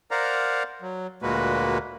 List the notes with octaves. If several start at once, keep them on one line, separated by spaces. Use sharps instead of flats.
A#4 C5 D5 F5 F#5 A#5
F#3
D2 A#2 G#3 A#3 F#4 B4